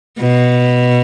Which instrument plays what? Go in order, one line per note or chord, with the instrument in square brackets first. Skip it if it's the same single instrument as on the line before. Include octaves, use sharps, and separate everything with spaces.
[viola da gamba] B2